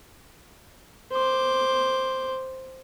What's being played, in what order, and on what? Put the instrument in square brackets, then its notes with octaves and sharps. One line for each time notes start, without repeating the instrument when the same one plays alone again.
[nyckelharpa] C5 D6